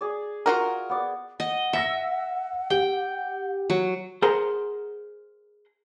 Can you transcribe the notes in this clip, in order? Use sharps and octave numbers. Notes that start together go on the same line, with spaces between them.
G#4 D5
F4 F#4 A#4
B3 D5
D#5 F#5
E5 E6 A#6 C#7
G4 G5
F#3
G#4 A#4 C5 F#5 A#5